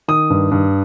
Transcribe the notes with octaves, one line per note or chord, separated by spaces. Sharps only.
D#3 D#6
G2
G2